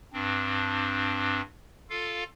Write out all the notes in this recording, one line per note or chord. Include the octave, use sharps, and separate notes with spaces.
G2 C4 D4
F4 A4 F5